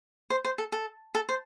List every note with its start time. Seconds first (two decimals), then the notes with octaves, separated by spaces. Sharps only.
0.30 C5
0.45 C5
0.58 A4
0.72 A4
1.15 A4
1.29 C5